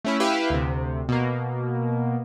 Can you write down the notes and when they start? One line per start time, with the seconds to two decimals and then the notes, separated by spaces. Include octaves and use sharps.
0.05 A3 C#4 E4
0.20 E4 G4 B4 E5 F5
0.50 D2 C3
1.09 B2 A#3